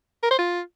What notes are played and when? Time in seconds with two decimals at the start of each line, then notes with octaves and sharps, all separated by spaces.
0.23 A#4
0.31 C5
0.38 F4